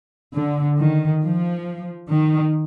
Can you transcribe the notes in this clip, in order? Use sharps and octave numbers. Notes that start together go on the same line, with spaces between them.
D3
D#3
F3
D#3